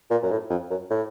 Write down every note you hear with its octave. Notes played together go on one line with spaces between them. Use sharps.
A#2
F#2
A2
F2
F#2
A2